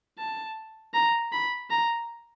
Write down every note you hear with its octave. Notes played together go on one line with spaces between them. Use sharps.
A5
A#5
B5
A#5